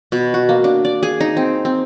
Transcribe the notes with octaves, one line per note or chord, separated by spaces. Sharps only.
B2
F#4
A#3
D4
D5
G#4
D#4
C4
C4